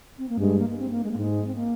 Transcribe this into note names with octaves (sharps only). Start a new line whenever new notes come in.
C4
A#3
G2 G#3
A#3
A#3
C4
A#3
G#3
A#3
G#2 G#3
C4
A#3